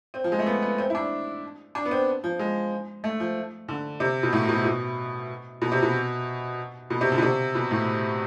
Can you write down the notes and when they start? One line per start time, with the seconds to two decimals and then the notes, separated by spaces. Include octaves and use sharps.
0.14 C4
0.24 F3
0.32 G#3
0.39 A3
0.46 B3
0.62 B3
0.78 C4
0.90 E4
0.95 D4
1.75 D4
1.85 B3
1.91 C4
2.24 F3
2.39 G#3
3.04 A3
3.20 F3
3.69 D3
4.00 C3
4.23 B2
4.33 A2
4.49 B2
4.65 B2
5.62 B2
5.72 C3
5.83 B2
6.90 B2
7.01 C3
7.12 D3
7.18 B2
7.22 C3
7.55 B2
7.71 A2